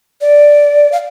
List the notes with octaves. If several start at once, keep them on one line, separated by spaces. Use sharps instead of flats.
D5
F5